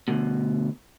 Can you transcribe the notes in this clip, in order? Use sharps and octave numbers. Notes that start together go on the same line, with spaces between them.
D2 B2